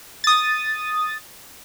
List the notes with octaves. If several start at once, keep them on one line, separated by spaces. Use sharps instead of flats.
D#6 A6